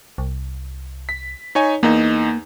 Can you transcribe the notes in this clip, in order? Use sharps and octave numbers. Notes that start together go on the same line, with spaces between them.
C2
B6
D#4 C#5 G#5
E2 A#3 D#4